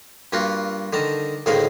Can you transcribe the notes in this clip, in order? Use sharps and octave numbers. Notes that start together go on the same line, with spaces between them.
G2 A#3 F4 F#4
D3 D#3 A5 A#5
D2 A2 D#3 G#3 A#4 F5